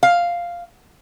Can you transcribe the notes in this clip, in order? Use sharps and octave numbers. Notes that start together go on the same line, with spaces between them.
F5